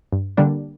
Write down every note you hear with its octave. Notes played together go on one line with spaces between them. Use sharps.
G2
D3 G3 A#3 D4